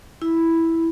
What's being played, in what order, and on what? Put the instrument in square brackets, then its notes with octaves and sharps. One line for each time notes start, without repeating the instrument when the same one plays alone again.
[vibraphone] E4